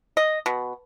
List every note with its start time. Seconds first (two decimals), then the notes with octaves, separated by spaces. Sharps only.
0.17 D#5
0.46 B2